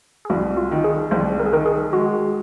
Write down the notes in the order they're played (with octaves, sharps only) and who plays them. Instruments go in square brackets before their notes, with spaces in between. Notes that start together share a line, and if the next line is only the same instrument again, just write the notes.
[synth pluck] G#4
[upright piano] C2 [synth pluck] F#4
[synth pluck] F4
[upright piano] D#3
[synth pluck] G#4
[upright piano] C2 [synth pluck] C5
[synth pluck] A#4
G#4
[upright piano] D#3 [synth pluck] A#4
[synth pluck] G#4
[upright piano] G#3 [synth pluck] F#4